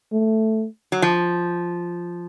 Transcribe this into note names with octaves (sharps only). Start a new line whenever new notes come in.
A3
F#3
F3